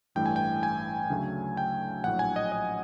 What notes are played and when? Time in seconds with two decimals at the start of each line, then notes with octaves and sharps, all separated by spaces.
0.15 A1 G2 E3 A3 G5
0.26 G#5
0.36 G5
0.63 G#5
1.10 D2 C#3 F#3 A3
1.57 G5
2.04 A#1 A2 F#3 F#5
2.19 G#5
2.36 D#5
2.52 D#5